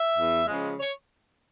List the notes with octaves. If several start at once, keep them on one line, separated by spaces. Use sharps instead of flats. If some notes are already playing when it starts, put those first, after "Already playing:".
Already playing: E5
E2
C#3 F3 G#3
C#5